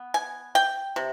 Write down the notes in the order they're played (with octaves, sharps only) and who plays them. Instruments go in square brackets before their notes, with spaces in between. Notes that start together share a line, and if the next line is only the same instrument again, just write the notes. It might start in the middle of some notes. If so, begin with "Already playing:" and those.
Already playing: [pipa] B3
G#5
G5
C3